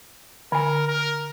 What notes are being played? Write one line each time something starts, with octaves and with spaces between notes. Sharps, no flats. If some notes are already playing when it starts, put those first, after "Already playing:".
D3 A#4 G#5
A#4